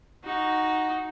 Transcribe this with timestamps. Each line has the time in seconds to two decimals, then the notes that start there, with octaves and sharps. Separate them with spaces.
0.24 D#4 F#4